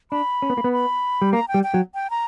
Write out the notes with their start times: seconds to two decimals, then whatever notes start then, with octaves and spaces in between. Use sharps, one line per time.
0.11 D4 B5
0.42 C#4
0.50 B3
0.58 A#3
0.64 B3
0.73 B5
1.22 G3
1.33 A#3 A#5
1.48 G5
1.54 G3
1.63 G5
1.74 F#3
1.94 G5
2.10 A#5